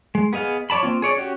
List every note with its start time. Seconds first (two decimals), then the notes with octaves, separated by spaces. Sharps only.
0.15 G#3
0.33 B3 G#4 D#5 F5
0.70 C#5 D5 A5 B5
0.83 A#3 C4 F4
1.02 G#4 C#5 D5
1.18 C#4 F#4 G4